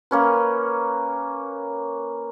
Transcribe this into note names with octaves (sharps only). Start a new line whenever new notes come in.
A#3 C#4 B4